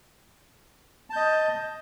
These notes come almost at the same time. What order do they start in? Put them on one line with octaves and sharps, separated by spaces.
A5 G6 D#5